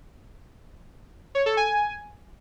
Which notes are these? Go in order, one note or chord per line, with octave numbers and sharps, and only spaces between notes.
C#5
A4
G#5